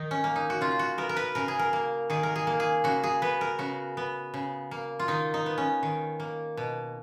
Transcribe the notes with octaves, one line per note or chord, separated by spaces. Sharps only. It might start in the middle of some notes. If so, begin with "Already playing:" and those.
Already playing: D#3 D#4
C#4
A#3
D#4
F#4
C#3 F4
F#4
B3 A#4
A#4
B4
C#3 A#4
G#4
A#4
A#3
D#3 G#4
A#4
G#4
A#3
G#4
C#3 F#4
G#4
B3 B4
A#4
C#3 F#4
B3
C#3
A#3
F4
D#3 D#4
D#4
B3
C#4
D#3
A#3
B2